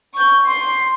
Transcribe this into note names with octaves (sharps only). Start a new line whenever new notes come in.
C#6 G6
C6 C7